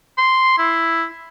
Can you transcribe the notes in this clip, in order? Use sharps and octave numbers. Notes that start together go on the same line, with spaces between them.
C6
E4